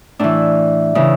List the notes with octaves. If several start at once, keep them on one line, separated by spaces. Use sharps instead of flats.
A2 E3 D4
C#3 E3